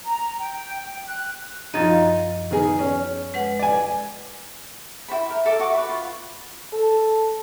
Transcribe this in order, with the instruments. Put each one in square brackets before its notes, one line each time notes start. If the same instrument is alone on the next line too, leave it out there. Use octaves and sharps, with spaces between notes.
[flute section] A#5
G5
F#6
[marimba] F#2 F3 D#5 [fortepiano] D#4 F4
[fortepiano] D#3 B3 G#4
C#4
[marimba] G#3 B4 F#5
[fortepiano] D5 G#5
[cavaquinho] E4 F#4 C5 B5
A#4
A4 E5 D6
F#4 C#6 D6
B4 B5
F4
[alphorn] A4